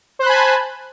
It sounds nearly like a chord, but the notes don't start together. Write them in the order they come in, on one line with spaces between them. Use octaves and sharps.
C5 F#6 B5 G#5 A5